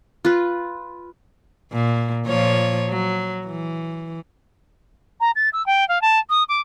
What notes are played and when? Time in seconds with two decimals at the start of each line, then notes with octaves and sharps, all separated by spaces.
0.25 F4 B4
1.73 A#2
2.26 A#2 F3 C#5
2.89 F#3
3.47 E3
5.21 A#5
5.36 A6
5.53 E6
5.66 G5
5.89 F5
6.02 A5
6.30 D#6
6.49 D6